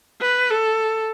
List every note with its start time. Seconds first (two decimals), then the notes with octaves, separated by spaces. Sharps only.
0.22 B4
0.50 A4